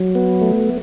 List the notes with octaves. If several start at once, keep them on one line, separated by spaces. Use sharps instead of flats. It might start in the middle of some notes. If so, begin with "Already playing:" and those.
Already playing: F#3
B3
A3